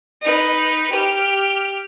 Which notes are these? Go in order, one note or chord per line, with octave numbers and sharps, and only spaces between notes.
D#4 B4
G4 F6